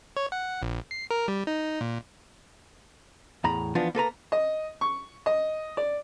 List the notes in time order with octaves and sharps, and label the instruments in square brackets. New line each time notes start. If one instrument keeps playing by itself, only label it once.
[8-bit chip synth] C#5
F#5
A#1
C7
A#4
G3
D#4
A#2
[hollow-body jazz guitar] E2 A2 A#5 B5
E3 F3 B3 D4 F4
A#3 A4 B4 A#5
[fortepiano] D#5
C#6
D#5
D5